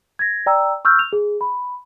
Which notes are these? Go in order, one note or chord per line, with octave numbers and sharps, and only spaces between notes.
G#6 A#6
D5 G5 A#5 E6
C#6 E6 F6 G6
F7
G#4
B5